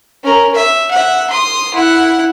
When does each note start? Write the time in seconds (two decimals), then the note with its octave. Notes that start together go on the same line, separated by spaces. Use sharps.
0.24 C#4 A#4
0.54 E5
0.91 E5 F#5
1.30 C6 D#6
1.74 E4 F#5